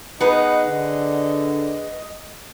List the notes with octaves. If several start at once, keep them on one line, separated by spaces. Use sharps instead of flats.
B3 D#4 G#4 B4 D#5 F#5
D3